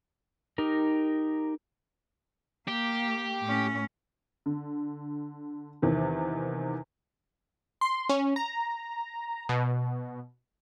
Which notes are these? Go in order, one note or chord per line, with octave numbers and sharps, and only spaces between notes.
D#4 G4 A#4
A#3 G4
A2 C#4
D3
E2 C3 D#3
C6
C#4
A#5
B2